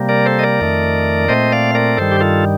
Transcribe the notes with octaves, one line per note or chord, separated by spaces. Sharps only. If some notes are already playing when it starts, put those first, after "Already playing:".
Already playing: C3 G3 A#3
A#4 D5
A4 C5
D#5
A#4 D5
F2 D#3 A3
A#2 A3 C4 C5 D#5
D5 F5
A#4 D5
G2 D#3 G3 A4 C5
G4
F4 A4